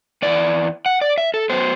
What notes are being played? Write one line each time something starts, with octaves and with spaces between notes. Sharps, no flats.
E2 C3 E3 B3 D5
F#5
D5
E5
A4
F#3 B3 C5